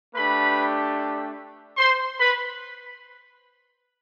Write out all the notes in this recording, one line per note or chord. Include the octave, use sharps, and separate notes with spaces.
A3 D4 G4 B4 B5
C5 C6
B4 B5